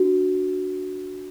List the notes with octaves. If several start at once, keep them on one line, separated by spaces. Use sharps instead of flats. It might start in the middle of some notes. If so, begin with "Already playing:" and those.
Already playing: D4 F#4